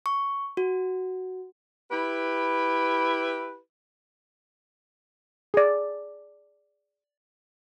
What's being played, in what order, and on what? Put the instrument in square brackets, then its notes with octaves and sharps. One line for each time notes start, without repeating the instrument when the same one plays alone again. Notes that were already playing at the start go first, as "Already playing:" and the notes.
[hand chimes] C#6
F#4
[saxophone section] E4 G4 B4
[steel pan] G#4 D5